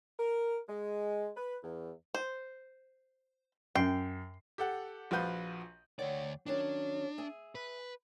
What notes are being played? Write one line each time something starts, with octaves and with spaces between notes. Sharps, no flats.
A#4
G#3
B4
E2
C5
F#2 G5 C7
G4 A4 F#5
A#1 F3 F4 F#4 B4 G6
D2 C#5 D5 F#5 G5
D#3 F#3 C#4 D4
G#4 E5
B4